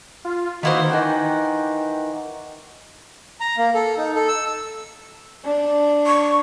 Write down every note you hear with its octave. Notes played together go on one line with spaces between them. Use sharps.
F4
D#3 A#3 B3 D#4 E4 F#4 C5
D#3 E3 F#5 G5
A#5
A#3
A4
D#4
A4
E6
D4
C#6